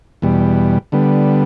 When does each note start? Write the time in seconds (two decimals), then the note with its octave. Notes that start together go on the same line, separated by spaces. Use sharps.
0.22 E2 B2 G3
0.92 D3 G3 B3